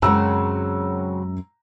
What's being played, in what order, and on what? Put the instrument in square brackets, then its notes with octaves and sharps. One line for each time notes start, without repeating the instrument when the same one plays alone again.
[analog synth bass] F#2 [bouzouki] C#3 F#3 C4 [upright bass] G#3 E4 [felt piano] A#5 E6